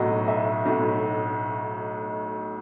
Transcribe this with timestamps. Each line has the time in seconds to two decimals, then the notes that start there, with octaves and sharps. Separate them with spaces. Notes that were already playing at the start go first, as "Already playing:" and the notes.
Already playing: B1 A2 F#3 D#5
0.28 E5
0.65 B1 A2 F#3